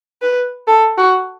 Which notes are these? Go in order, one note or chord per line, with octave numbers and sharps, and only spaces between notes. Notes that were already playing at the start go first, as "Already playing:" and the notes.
B4
A4
F#4